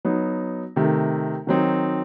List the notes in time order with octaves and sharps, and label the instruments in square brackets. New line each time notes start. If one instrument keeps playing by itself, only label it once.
[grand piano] F#3 B3 D#4
C3 D#3 A3
D#3 F#3 C4 D#4